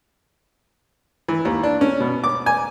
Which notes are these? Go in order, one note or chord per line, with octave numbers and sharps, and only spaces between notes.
E3
D#2
D4
C#4
B2
D6
G#5